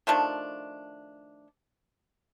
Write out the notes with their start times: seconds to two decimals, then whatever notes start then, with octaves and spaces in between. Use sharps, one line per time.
0.07 D#3 F3 A3 D4